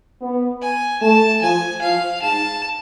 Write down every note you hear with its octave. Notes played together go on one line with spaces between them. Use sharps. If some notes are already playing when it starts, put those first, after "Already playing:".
B3
G#5
A3 A5
F3 G#5
F3 F5
G#2 A5